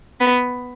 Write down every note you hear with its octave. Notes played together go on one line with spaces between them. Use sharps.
B3